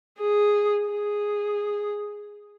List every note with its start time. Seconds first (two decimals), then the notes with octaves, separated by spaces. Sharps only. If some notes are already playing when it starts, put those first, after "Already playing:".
0.19 G#4
0.90 G#4